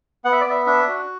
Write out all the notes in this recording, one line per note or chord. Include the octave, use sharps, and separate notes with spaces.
B3 F#5
E5
D5
B3 E5
D4 E5
F#4